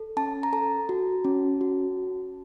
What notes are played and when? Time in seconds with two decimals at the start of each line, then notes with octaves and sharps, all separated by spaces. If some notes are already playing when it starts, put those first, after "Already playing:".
Already playing: A4
0.17 C#4 A5
0.43 A#5
0.52 A4 A5
0.89 F#4
1.25 C#4
1.61 F#4